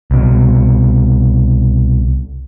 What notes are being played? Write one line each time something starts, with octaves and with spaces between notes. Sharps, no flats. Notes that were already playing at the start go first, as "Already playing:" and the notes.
C2 B2